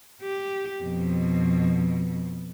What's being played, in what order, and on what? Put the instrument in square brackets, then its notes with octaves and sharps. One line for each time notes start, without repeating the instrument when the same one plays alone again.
[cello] G4
F2 B2